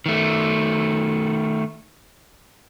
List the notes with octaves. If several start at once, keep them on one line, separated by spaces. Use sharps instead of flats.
D#3 A3